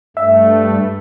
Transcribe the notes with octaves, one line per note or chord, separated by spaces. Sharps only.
G2 A3 E5